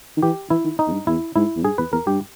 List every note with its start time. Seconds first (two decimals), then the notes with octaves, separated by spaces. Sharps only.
0.17 D#3
0.22 E3 G4
0.50 E3 E4
0.65 D#3
0.79 D#4
0.87 E2
0.93 G2
1.07 E2 E4
1.36 G#2 E4
1.57 E2
1.64 G2 G#4
1.78 E2 B4
1.92 E2 A#4
2.07 G2 G4